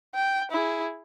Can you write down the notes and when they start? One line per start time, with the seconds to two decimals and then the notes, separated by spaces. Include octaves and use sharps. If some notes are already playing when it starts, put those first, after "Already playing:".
0.15 G5
0.51 E4 G#4